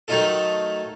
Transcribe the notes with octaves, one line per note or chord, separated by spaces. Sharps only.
D#3 F#3 A3 D#4 F4 A4